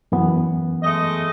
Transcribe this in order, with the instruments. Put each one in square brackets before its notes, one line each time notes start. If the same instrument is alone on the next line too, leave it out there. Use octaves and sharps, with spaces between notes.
[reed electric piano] F#2 E3 B3
[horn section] G#3 A3 D#5